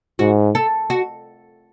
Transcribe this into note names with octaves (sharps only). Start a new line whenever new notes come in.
G#2 F#4
A4
F#4